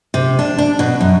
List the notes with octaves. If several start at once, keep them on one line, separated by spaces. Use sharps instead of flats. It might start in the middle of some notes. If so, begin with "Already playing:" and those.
C3
D4
D4
B2
F#2